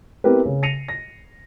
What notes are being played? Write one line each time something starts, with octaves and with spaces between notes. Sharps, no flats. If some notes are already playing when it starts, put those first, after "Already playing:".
B3 C4 E4 G4 A#4 B4
C#3
A#6 C7 C#7 D#7 F7
A#6